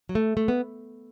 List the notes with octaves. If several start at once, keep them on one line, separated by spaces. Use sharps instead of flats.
F#3
A3
A3
B3